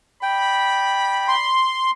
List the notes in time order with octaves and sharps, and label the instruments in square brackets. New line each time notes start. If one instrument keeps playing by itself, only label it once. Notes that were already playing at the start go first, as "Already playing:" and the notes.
[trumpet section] D5 B5 [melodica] G5
[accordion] C6